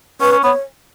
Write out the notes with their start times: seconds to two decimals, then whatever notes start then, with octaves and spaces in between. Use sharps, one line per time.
0.21 C#4 B4
0.32 C#4
0.43 B3 C#5